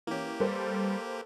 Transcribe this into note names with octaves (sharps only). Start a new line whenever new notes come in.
E3 A#3 C#4 G4
G3 A4 B4 C5